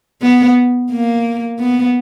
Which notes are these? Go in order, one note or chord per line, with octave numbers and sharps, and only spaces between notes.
B3
A#3
B3